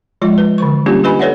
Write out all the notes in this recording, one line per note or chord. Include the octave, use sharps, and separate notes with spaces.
F3 G#3 F4 D#5
B4
D3 E3 C#6
G3 A#3 C#4 D4 F4 G4
F4 G4 B4 D#5 G#5 B5
A4 B4 C#5 D5 E5 F#5